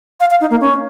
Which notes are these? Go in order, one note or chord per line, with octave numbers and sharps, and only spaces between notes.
F5
F5
D#4
A#3
C#4